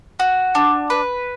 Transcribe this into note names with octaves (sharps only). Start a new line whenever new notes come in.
F#4
D4
B4